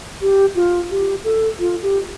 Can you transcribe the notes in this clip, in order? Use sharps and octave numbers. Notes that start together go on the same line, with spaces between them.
G4
F4
G4
A4
F4
G4